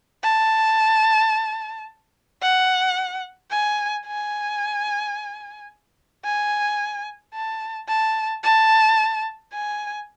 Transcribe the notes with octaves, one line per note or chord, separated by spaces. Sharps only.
A5
F#5
G#5
G#5
G#5
A5
A5
A5
G#5